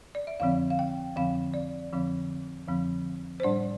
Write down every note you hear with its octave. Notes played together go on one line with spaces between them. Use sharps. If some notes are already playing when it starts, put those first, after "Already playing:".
D5
E5
F2 D3 F3 C4 F5
F5
G5
F2 D3 F3 C4 F5
D5
F2 D3 F3 C4
F2 D3 F3 C4
C5
A2 G3 D4 D5